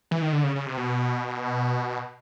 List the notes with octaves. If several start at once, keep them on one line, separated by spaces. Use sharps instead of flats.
E3
D#3
D3
C#3
C#3
C3
B2